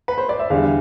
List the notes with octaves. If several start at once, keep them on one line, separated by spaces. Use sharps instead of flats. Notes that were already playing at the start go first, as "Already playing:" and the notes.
B4
C5
D5
E5
E2 D3 G3 F5